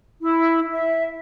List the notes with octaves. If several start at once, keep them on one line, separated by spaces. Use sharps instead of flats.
E4
E5